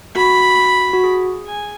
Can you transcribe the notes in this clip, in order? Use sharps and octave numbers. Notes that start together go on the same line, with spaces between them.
F#4 B5
F#4
G#4
G#5